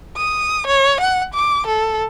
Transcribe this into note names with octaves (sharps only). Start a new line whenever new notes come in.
D#6
C#5
F#5
D6
A4